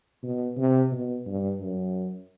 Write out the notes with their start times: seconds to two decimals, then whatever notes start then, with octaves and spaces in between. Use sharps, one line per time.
0.23 B2
0.57 C3
0.92 B2
1.26 G2
1.60 F#2